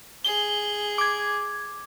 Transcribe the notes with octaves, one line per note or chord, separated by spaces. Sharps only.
G#4 G7
D6 G#6